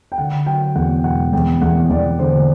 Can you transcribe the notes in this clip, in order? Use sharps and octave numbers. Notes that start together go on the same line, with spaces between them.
G5
D3 F#5
F#3 G5
E2 F#5
E1 F#5
E2 G5
E2 F#5
E2 D5
D3 C5